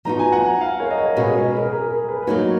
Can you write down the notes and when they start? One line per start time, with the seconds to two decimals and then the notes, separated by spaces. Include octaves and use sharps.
0.05 F3 B3 D#4 F#4 A#5
0.19 G#5
0.32 F#5 A#5
0.61 F5 G#5
0.80 A#4 C#5
0.91 D#5
0.98 A#4 C#5
1.16 B2 G#3 C#4 F#4 G#4 B4
1.30 G#4
1.44 A#4
1.58 A#4
1.72 G#4
1.91 A#4
2.08 G#4 B4
2.23 B4
2.27 F#3 A#3 D#4 F#4 A#4 C#5